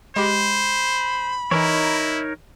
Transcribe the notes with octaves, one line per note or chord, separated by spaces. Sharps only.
G#3 G4 C5 B5
E3 D#4 E4 A#4 C#5